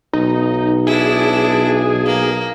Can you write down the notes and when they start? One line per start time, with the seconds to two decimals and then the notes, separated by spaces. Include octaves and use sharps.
0.13 B1 D#4
0.87 D4 E4 G#4
2.05 A#3